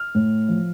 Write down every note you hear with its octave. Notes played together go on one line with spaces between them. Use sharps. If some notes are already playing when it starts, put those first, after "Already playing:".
Already playing: F6
A2
F3